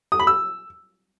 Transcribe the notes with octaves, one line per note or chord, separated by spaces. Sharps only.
D#6
B5
E6